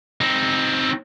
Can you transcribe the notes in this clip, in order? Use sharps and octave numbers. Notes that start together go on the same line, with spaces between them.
C4 D#4